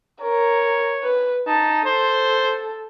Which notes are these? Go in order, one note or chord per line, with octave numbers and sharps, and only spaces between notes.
A#4 C#5
B4
D#4 A5
A4 C5